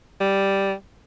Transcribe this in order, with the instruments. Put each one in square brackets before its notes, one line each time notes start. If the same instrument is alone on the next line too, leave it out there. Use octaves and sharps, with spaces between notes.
[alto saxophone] G3